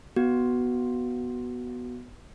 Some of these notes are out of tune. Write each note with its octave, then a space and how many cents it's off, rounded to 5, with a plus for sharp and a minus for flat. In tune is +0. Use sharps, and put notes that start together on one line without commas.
B3 -5 F#4 +10